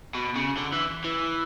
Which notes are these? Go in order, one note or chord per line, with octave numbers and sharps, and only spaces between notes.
B2
C#3
D3
E3
E3